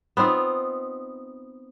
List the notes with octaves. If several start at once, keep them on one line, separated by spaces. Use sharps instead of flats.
B3 C4 D#4 F4